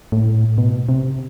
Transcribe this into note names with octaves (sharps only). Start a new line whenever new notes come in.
A2
B2
C3